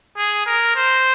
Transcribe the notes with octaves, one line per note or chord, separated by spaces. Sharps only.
G#4
A#4
C5